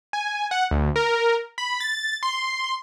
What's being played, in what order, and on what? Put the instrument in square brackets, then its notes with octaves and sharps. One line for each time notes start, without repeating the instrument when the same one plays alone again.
[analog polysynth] G#5
F#5
D2
A#4
B5
A6
C6